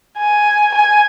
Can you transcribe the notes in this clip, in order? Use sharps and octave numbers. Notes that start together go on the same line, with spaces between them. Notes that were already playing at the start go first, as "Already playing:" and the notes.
G#5
G#5